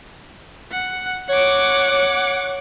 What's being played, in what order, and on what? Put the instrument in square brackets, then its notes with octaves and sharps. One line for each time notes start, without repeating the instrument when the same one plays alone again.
[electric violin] F#5
[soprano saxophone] C#5 [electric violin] F#5 D6
[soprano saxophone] C#5